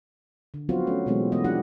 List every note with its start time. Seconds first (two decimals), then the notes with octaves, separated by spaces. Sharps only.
0.54 D3
0.69 F3 F#3 B3 C4 F4 F#4
0.87 A3 C#4
1.06 B2 E3 F#3 G#3 B3 C4
1.32 E3 A3 B3 D#5
1.44 F3 D4 F#4 G4 F#5